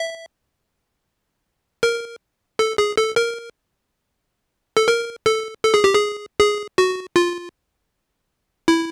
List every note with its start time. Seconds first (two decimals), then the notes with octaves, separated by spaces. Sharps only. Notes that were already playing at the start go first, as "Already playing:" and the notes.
Already playing: E5
1.83 A#4
2.59 A4
2.78 G#4
2.97 A4
3.16 A#4
4.77 A4
4.88 A#4
5.26 A4
5.64 A4
5.74 G#4
5.84 G4
5.94 G#4
6.40 G#4
6.78 F#4
7.16 F4
8.68 E4